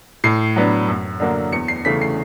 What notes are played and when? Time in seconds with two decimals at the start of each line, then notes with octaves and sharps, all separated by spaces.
0.24 A2 C7
0.56 F#3 B3 D4
0.88 F#2
1.20 D3 F#3 A#3 D4
1.52 E2 C#7
1.68 C7
1.85 C#3 E3 A3 C#4 B6
2.02 C7